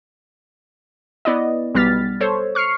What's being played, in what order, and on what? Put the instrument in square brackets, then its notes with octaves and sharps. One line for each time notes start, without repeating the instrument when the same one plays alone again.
[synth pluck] B3 E4 D5 D#5
B1 G3 B3 F6 A6 B6
A4 C5 C#5
C#6 F6 C7 C#7